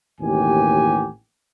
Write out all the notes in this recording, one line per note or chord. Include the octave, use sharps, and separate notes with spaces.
A1 D#2 B2 G4 G#5